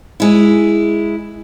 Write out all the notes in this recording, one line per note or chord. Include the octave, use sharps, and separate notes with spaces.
G#3 E4